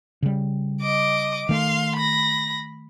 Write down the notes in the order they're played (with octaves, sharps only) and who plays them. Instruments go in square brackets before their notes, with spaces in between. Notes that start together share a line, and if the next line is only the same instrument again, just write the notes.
[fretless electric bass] C#3 G3
[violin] D#5 D6
[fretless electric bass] D#3 A3 [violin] F5 C6
[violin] B5 A#6